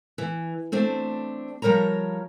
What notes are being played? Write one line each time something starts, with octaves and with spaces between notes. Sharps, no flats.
E3
A3 C4 D4
F3 G3 A#4 C#5 A#5